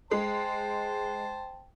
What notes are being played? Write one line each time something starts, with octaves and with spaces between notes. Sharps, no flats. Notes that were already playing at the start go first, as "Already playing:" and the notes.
G#3 C5 G5 A5